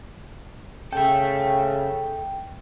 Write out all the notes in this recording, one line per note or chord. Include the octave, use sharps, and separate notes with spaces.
C#3 A4 E5 G5